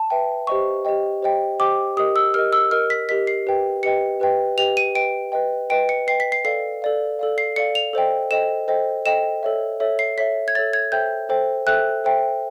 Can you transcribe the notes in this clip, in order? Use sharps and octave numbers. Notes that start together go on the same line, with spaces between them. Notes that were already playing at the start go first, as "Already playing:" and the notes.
Already playing: A5
B4 E5 G5
G4 C5 D#5 G5 C#6
G4 C5 D#5 G5
G4 C5 D#5 G5
G4 C5 D#5 G5 D6
G4 A#4 D#5 D#6
E6
G4 A#4 D#5 F6
E6
G4 A#4 D#5 F6
B6
G4 A#4 D#5 B6
C7
G4 B4 D#5 G5
G4 B4 D#5 G5 C#7
G4 B4 D#5 G5
G4 B4 D#5 G5 F7
D#7
B4 D#5 G5 D7
B4 D#5 G5
B4 D#5 G5 D7
C#7
B4 D#5 G5 C7
B6
C7
A4 D5 F5 C7
A4 D5 F5
A4 D5 F5
C7
A4 D5 F5 C#7
F7
A4 C5 D#5 G5
A4 C5 D#5 G5 E7
A4 C5 D#5 G5
A4 C5 D#5 G5 E7
A4 C#5 E5
A4 C#5 E5
C7
A4 C#5 E5 B6
G#6
A4 C#5 E5 A6
G#6
A4 C5 E5 G5 G6
A4 C5 E5 G5
A4 C5 E5 G5 F#6
A4 C5 E5 G5